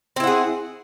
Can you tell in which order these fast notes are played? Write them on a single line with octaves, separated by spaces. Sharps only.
C4 E4 F#5 G#4